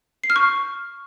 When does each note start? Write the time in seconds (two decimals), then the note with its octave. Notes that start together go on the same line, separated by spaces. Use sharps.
0.24 C7
0.30 F6
0.36 C#6